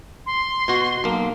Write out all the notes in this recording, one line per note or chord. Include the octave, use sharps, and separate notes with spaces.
C6
B2 F#4
B1 A#3